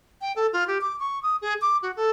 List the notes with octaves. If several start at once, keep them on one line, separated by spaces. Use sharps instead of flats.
G5
A4
F4
G4
D6
C#6
D#6
G#4
D6
F#4
A4